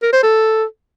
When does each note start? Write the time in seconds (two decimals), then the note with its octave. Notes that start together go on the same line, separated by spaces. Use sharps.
0.02 A#4
0.13 C5
0.23 A4